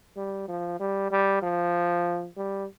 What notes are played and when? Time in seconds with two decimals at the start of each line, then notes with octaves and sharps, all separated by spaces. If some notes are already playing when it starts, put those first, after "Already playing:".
0.17 G3
0.48 F3
0.80 G3
1.11 G3
1.42 F3
2.37 G3